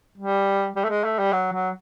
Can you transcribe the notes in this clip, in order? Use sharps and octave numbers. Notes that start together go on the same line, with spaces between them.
G3
G3
A3
G#3
A3
G3
F#3
F#3